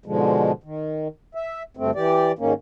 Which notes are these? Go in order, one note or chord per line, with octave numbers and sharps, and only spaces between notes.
G#2 B2 D3 F3 G#3
D#3
E5
D2 G2 A3 C4
E3 G4 D5
G#2 D#3 A#3 C#4